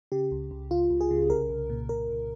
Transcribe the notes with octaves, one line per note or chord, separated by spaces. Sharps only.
C#3 G4
C#2
C#2
C#2 F4
C#2
G#4
C#3
C2 A#4
C2
A#2
C2 A#4
C2